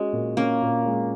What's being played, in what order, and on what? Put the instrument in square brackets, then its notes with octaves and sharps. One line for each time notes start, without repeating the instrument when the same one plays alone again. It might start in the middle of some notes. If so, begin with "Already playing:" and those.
Already playing: [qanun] G#3 [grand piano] C#4 F#4
[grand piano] A#2
[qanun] A#3 [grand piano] C#4
[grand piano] A#2
G#3